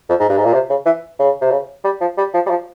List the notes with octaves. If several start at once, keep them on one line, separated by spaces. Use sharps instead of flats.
F2
G#2
G2
G#2
A#2
C3
C#3
E3
C#3
C3
C#3
G3
F3
G3
F3
G3
F3